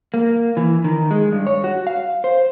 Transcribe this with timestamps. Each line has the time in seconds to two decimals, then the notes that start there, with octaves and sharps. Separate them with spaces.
0.14 A#3
0.57 E3
0.84 D#3
1.11 G#3
1.32 G2
1.47 C#5
1.64 F#4
1.87 F5
2.24 C5